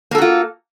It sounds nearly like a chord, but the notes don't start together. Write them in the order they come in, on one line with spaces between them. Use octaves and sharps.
A#3 A4 F#4 F4